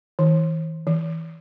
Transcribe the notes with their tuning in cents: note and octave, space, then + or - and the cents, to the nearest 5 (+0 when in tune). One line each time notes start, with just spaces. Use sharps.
E3 -40
E3 -15